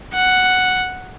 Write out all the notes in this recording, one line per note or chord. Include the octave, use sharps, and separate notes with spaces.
F#5